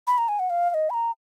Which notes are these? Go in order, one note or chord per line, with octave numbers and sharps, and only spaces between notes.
B5
A#5
G#5
F#5
F5
F5
D#5
B5
A#5